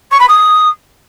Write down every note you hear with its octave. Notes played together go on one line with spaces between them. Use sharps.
C#6
B5
D#6